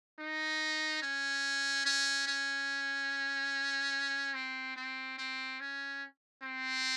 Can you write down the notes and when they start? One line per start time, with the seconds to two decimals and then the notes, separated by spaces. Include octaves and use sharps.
0.19 D#4
1.02 C#4
1.85 C#4
2.27 C#4
4.34 C4
4.76 C4
5.18 C4
5.60 C#4
6.42 C4